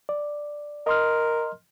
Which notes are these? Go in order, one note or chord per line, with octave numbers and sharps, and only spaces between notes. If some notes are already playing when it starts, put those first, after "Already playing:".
D5
A#4 D#5 C6 F6